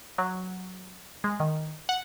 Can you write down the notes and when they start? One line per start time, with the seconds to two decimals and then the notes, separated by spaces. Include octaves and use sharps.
0.18 F#3
1.24 G#3
1.40 D#3
1.89 F#5